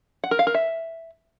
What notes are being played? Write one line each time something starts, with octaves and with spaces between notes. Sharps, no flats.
F#5
A#4
F5
A#4
E5